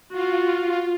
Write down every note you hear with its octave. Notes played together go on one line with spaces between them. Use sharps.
F4 F#4